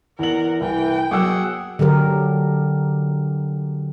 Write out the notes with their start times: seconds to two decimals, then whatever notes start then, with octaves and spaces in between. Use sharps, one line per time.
0.19 E2 A#4 F#5 F#7
0.61 C2 E3 G5
1.11 F#3 A#3 G#4 F#5 D6 E6
1.79 D3 F#3 G4 A#4